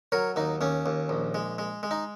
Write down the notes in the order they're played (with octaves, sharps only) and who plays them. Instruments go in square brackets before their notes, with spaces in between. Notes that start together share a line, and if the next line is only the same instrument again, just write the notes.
[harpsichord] F#3 A#4 C#5
D#2 D#4
D#2 C#4
D#2
A#1
G#3
G#3
G#3
D#4